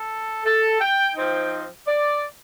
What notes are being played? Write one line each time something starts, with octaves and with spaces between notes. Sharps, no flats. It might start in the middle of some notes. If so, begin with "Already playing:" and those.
Already playing: A4
A4
G5
F3 C4 D#4 G5
D5